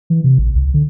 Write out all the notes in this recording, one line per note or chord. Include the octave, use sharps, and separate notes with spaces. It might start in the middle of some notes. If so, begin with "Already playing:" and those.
E3
C3
A1
C2
D3